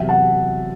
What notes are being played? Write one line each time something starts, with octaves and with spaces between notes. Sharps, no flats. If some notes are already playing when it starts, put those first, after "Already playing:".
Already playing: E2 C3 F#3 E5 G5
F#5 A5